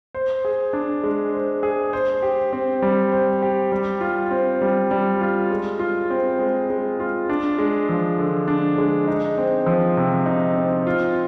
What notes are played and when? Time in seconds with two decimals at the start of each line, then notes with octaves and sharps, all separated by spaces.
0.14 C5
0.45 G#4
0.73 D4
1.04 G#3
1.34 C5
1.63 G#4
1.93 C5
2.23 G4
2.53 C4
2.82 G3
3.12 C5
3.42 G4
3.72 G3
4.01 F4
4.31 C4
4.61 G3
4.91 G3
5.21 F4
5.51 G#3
5.79 F4
6.10 C4
6.39 G#3
6.70 G#3
7.00 F4
7.29 D4
7.58 G#3
7.89 F3
8.18 D3
8.48 D4
8.78 G#3
9.08 D#4
9.38 C4
9.66 F3
9.97 C3
10.26 D#4
10.57 C4
10.87 F4